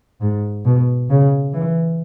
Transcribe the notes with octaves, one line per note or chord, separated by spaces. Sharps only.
G#2
B2
C#3
E3